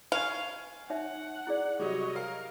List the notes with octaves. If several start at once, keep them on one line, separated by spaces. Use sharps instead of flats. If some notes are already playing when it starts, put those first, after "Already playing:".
F5 G#5 C#6 G#6
D#4 C#5 E5 F#5
E4 G#4 D5
C3 F#3 G3 G#4 C#5 D#5
A#4 F5